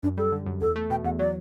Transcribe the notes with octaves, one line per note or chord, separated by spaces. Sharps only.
F#2 D4
G3 A4
D3
F#2
E2 A4
A3
B2 G5
E2 F#5
F#3 D5